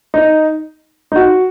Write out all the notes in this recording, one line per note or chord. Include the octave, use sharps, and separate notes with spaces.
D#4
D#4
F#4